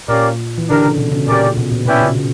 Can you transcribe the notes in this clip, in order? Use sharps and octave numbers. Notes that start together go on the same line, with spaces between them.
A#2 A#3 C#4 G4 A#4 D5
E3
D3 D4 G4 A#4
C#3
B2
C#3
A#2 C#4 G4 A#4 D5
B2
A#2
B2 C#4 E4 B4 D5 G5
C#3
C#3